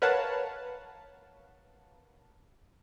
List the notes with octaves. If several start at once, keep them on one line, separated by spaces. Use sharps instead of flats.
A#4 B4 C#5 F5 F#5 A5